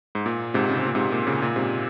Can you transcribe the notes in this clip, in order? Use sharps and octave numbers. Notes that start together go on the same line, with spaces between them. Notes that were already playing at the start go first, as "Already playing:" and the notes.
G#2
A#2
G#2 C3
C#3
C3
A#2
G#2 C3
A#2
A#2 C#3
A#2
G#2 C3